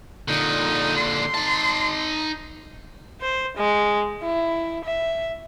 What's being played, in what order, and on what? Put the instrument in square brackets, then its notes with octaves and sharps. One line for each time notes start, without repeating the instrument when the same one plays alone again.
[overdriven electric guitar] A#2 D3 [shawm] D#4
[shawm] C6
[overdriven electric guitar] D#4 A5
[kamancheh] C5
G#3
E4
E5